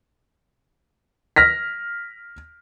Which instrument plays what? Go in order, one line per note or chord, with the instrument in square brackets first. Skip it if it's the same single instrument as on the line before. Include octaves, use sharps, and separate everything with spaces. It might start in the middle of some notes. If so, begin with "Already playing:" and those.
[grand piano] F6 A#6 B6